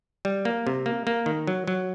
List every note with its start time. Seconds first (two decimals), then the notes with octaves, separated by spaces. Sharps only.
0.25 G3
0.45 A#3
0.67 C3
0.86 A#3
1.07 A#3
1.26 D#3
1.47 F#3
1.68 F#3